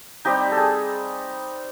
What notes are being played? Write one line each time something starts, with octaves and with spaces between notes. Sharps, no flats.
G3 C4 D#4 G4
A4
G#4